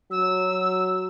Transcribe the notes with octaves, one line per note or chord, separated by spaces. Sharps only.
F#3 E6